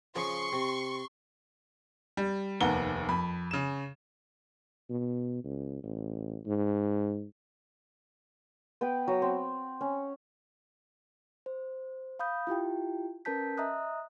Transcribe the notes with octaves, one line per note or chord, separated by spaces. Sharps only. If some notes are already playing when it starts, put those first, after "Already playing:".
C#3 F3 C6 C#6
C3
G3
F1 D#2 B3 F#5 A#5 G7
F2 B5
C#3 E7
B2
C#2
A1
G#2
B3 B4 G5
F#3
C4
C#4
C5
F5 B5 D#6 G6
E4 F4 G4 G5
C#4 A#4 B4 A5 G6 B6
D#5 E5 A#5 D#6 F#6